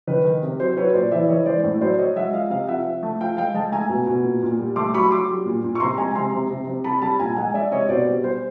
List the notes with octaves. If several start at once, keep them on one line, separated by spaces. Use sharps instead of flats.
D#3 B4
D#3
C3
F#3 C5
F#3 B4 C#5
A#2 C5 D5
E3 D5 E5
E3 C#5 D#5
G#3 C5 D5
A2
F#3 C5 D5
F#3 C#5 D#5
G#3 E5 F#5
F3 D#5 F5
C3 D#5 F5
F3 E5 F#5
F3
A3
F3 F5 G5
G#3 F5 G5
G#3 G5 A5
A3 G#5 A#5
B2
B2
A#2
A#2
G3
A3 C6 D6
F#3 B5 C#6
F#3 C6 D6
G3
A#2
A#2
C#6
C3 A#5 C6
G#3 G#5 A#5
C3 A#5 C6
C3
C3
C3
G3 A5 B5
G3 A5 B5
A#2 G#5 A#5
G#3 F#5 G#5
G#3 D5 E5
C3 C#5 D#5
B2 C5 D5
G3
G3 C5